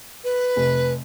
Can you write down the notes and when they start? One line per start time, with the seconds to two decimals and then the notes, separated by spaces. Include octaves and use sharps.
0.24 B4
0.56 F1